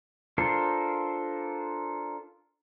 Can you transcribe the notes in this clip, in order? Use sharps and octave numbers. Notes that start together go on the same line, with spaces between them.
D4 F4 A4 A#4 C5